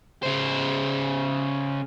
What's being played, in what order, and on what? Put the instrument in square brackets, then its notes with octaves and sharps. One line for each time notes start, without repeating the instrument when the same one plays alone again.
[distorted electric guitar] C#3 C5